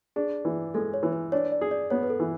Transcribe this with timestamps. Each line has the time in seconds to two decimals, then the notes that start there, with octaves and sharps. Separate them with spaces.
0.16 D4 G#4
0.45 E3
0.74 G#3 A4
0.94 C#5
1.03 E3
1.13 B4
1.32 D4 C#5
1.52 D5
1.61 G#4
1.71 D5
1.90 B3 C#5
2.03 B4
2.10 A4
2.20 E3